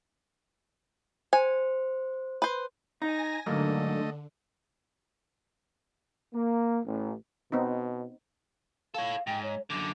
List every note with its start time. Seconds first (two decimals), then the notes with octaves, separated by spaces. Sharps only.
1.33 C5 G#5
2.42 B4 C5
3.02 D#4 G#5 A#5 A#6
3.46 G#2 D3 F#3 A3 A#3 D#5
6.33 A#3
6.86 A1
7.52 B2 B3 C4 D#4
8.94 A4 C#5 F5
9.27 G#2 G5
9.43 C#5
9.70 F#2 D3 D6